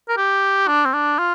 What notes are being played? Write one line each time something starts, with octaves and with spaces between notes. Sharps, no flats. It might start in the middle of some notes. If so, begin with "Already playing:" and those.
A#4
G4
D4
C4
D4
F4